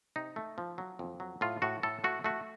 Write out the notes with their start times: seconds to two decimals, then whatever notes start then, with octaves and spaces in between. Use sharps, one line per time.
0.16 C3 D#4
0.36 A3
0.58 F3
0.78 F#3
0.99 F2
1.20 F#3
1.41 A2 F4
1.62 A2 F#4
1.83 A2 A4
2.04 A3 F#4
2.24 A3 F#4